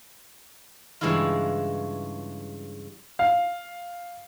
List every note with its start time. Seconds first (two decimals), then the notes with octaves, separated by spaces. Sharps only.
1.01 G2 C#3 E3 G#3 E4 F4
3.19 F5